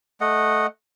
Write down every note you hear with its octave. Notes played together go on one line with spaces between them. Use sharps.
A3 D#5 F#5